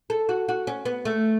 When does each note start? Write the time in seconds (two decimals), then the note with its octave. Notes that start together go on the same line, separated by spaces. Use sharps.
0.10 A4
0.29 F#4
0.49 F#4
0.67 C#4
0.85 B3
1.05 A3